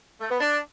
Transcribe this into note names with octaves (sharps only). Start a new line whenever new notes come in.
A3
B3
D4